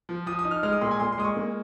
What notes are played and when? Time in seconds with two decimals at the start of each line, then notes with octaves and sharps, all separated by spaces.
0.09 F3
0.26 F3 D#6
0.39 D#6
0.45 D#4
0.51 F6
0.63 G#3 F6
0.72 D#6
0.81 A#2 C6
0.91 G#5
1.00 A#2 C6
1.12 C6
1.18 G#3 D#6
1.24 C#6
1.36 A#3